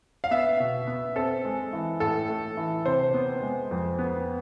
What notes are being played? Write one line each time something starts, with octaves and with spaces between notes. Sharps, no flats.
F5
B3 E5
B2
B3
C4 A4
G#3
E3
A2 A4
A3
E3
C3 C5
B3
G#3
F2
B3